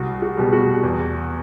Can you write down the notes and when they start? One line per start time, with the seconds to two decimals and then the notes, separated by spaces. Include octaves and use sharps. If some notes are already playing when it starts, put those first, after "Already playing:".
Already playing: C2 F#4
0.22 F#4
0.37 B2 G3
0.53 F#4
0.84 E2